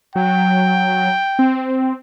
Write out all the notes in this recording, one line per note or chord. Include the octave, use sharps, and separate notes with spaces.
F#3 G5
C4